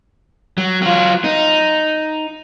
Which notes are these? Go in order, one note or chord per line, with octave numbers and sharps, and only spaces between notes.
F#3
F#3 F4
D#4